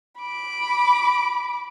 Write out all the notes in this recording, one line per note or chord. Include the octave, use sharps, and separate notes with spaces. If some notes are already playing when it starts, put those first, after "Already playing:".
B5 D6